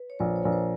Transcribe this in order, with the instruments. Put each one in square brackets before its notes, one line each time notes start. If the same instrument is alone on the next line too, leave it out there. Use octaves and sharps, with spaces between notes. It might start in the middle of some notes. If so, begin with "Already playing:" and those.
Already playing: [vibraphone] B4
C#5
[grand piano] A#1 [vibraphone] C5
[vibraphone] C#5
[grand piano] A#1
[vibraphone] C5